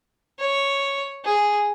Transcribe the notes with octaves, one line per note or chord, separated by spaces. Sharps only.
C#5
G#4